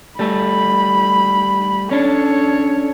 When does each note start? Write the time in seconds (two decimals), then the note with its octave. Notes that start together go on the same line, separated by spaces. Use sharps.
0.19 G3 A3 A4 B5
1.91 C#4 D4 A4 C#5